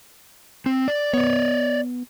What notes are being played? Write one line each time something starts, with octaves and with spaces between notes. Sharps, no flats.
C4
D5
B3 C#5 D5